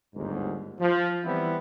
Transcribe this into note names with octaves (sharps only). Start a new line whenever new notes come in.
G1 D#2 G#2
F3
E3 G3 B3 C4 E4